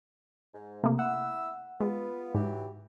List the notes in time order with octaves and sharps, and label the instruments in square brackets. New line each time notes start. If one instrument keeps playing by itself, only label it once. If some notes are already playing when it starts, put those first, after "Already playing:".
[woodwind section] G#2
[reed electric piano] C3 [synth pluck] A3 A#3
[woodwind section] E4 E5 E6 [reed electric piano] F#5
[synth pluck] G#3 [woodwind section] B3 F4
[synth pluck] G#2 [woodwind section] E3 F#3 G4